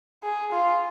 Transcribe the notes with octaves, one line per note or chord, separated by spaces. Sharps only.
G#4
F4